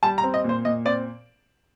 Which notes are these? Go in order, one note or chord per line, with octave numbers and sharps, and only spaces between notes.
G3 A5
A#5
C4
D#5
A#2
C5
A#2 D#5
C4 D5